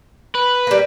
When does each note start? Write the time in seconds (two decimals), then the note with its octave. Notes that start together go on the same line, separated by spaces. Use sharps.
0.35 B4
0.67 G3 A#3